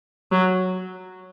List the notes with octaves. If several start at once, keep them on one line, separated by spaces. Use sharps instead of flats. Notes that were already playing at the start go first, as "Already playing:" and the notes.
F#3